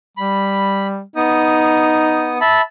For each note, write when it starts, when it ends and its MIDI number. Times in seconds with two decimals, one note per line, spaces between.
0.17 1.02 55
0.17 0.87 83
1.16 2.38 59
1.16 2.49 63
1.16 2.38 87
2.41 2.61 76
2.41 2.61 81
2.41 2.61 83